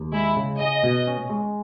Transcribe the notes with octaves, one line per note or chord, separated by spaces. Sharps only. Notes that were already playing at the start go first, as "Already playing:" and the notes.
Already playing: D#2
G#3 E4
C#3
G#4 D#5
B2
C#4
G#3